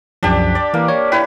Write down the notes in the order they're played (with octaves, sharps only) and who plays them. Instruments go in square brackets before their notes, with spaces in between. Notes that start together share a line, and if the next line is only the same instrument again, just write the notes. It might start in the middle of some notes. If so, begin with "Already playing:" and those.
[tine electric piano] C2 F#2 F3 [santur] D4 G4
[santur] D5
[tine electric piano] E3 [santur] A#3
[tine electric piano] C#5
[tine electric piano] E4 G5 [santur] B4 C#5